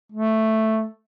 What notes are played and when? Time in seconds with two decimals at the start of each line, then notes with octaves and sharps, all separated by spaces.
0.12 A3